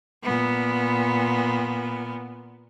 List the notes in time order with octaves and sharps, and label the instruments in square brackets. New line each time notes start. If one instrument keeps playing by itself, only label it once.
[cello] A#2 B3